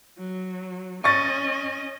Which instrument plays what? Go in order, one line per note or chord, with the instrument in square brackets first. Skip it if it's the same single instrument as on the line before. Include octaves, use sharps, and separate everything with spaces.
[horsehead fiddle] F#3
[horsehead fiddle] C#4 D#5 [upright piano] C#6 A6 A#6